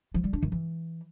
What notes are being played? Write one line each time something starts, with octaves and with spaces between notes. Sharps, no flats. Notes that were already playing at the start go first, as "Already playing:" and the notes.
F3
G3
D4
D#3
E3